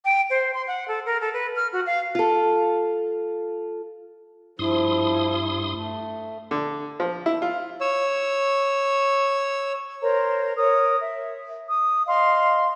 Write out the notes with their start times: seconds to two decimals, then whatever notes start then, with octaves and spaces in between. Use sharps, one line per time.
0.05 G5
0.30 C5
0.54 C6
0.67 F#5
0.88 A4
1.06 A#4
1.21 A4
1.33 B4
1.56 F6
1.73 F#4
1.86 F5
2.15 F4 A4
4.59 G2 F3 E4 C6 D#6
5.70 A3
6.51 D3
7.00 F3
7.26 E4
7.42 F4
7.81 C#5 E6
10.01 A#4 C5 C#5 A#5
10.57 A#4 C#5 D#6
10.98 E5
11.67 D#6
12.07 D#5 F5 C6